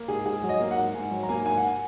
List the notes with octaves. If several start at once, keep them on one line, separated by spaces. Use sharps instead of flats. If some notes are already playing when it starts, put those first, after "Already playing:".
Already playing: A#3
G#2 G#4
G#2 G#4
F#3
D#5
A#3
F#5
G#2
G#2 G#5
F#3
A#5
A#3 G#5
G#2 G#5
F#5
G#5